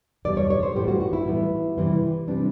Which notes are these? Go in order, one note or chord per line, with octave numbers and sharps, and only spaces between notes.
E2 B2 G3 D5
C#5
C#5
C5
A2 E3 G3 B3 G4
F#4
F#4
E4
A2 E3 G3 B3
C3 E3 G3 C4
C3 E3 G3 C4 D4